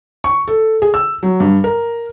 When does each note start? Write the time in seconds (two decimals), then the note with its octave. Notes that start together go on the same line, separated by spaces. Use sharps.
0.24 C#6
0.48 A4
0.82 G#4
0.94 E6
1.23 F#3
1.40 G2
1.64 A#4